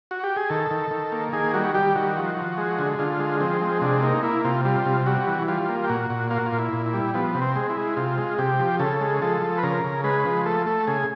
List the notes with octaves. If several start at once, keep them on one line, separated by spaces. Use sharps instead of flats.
F#4
G4
G#4
D#3 A4
D#3
D#3
A#3
D#3 G#4
G3 F#4
G3 G4
D#3 F#4
F3
F3
G#3
D3
D3 F4
G#3
F3 C4
G#3
C3 D4
A#3 D#4
A#3 E4
C3 F4
G3 F4
C3
G3 F#4
E3
G3 F4
A#3
G4
A#2 F#4
A#2
A#3 F4
F#4
F4
A#2
E4
A#2
E4
G3
F3 B3
C3
C4
G#3
E4
G#3
C3 F4
G#3
C3 G4
F3
C#3 A4
G#3
F3 A4
F3
B4
C#3 A#4
C#3
G#3 B4
F3
A3 A4
A3 A4
C#3 G#4